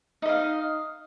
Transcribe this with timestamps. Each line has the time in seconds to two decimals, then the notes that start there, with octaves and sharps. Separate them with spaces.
0.22 D#4
0.26 D#5
0.29 F5